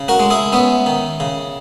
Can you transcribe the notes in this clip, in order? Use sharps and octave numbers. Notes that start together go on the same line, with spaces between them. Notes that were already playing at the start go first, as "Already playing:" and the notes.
Already playing: C#3
F#4 A#4
G#3
E4 G#4
B3 C#4 E4
D#3
C#3